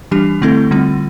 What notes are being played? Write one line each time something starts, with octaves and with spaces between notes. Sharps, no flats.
E3 G3 D4 G4
D3 A3 C4 E4 A4
D3 G3 C4 F4